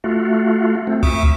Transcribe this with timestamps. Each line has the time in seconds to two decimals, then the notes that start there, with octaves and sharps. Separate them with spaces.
0.04 A3 F4 F#4
0.87 A3 C4
1.03 D2 E5